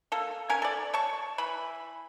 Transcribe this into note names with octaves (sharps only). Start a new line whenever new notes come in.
A#3 A4
C#4 A#4 G#5
A4 D5
C#5 A5 C#6
E3 B5